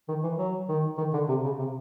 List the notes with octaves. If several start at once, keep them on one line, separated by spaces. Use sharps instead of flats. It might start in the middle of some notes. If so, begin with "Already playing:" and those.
D#3
E3
F#3
D#3
D#3
D3
C3
C#3
C3